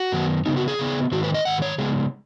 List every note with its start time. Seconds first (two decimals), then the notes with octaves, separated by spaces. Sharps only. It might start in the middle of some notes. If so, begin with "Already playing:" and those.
Already playing: F#4
0.12 F#2 D#3 B3
0.46 C#3 B3 D#4
0.57 F#4
0.68 G#4
0.79 C#3 B3
1.12 G#2 D#3 G#3 F#4
1.23 B4
1.34 D#5
1.45 G#2 D#3 F#5
1.62 C#5
1.78 C#3 G#3 B3 G#4